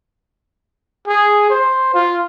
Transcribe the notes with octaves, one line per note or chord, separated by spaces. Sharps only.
G#4
C5
F4